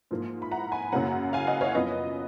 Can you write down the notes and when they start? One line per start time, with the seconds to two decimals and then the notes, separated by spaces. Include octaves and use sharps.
0.11 G#2 F3 A#3
0.42 B5
0.51 F#5 A#5
0.72 G#5 B5
0.92 F#2 C#3 F#3 A#3 C#4 F#5 A#5
1.33 F5 G#5
1.47 D#5 F#5
1.61 C#5 F5
1.74 F#2 F3 B3 B4 D#5